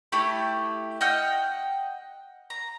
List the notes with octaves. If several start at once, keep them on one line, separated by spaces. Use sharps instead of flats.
A3 E4 G4
D#5 F#5 G5 F6
A#5